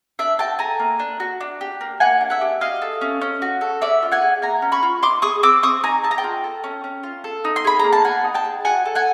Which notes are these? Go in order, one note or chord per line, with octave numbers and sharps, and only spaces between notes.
D4 D5 E5
F#4 G5 A5
A4 G#5 A#5
A#3
D4
F#4
D4
G4
A#3
A#3 F#5 G#5
D4
E5 F#5
G4
F#4 D#5 F5
A4
C#4
C#4
F#4
A4
C#4 D5 E5
F4
F#5 G#5
G#4
A#3 G#5 A#5
C#4
B5 C#6
F4
D#4 C6 D6
G#4 C#6 D#6
C4 D6 E6
C4 C#6 D#6
D#4 G#5 A#5
G#4 A5
A#5
G5 A5
F4
A4
C#4
C#4
F4
A4
D#4
C6
G#4 B5
A#3 A#5
A5
A#3 F#5 G#5
D#4
G5 A5
G#4
F#4 F#5 G#5
A4
F#5 G#5